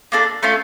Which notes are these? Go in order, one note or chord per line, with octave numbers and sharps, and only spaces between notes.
A#3 D4 F4 A4
A3 C#4 F4 A4